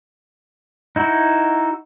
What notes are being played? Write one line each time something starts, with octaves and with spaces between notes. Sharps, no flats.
D#4 E4 F#4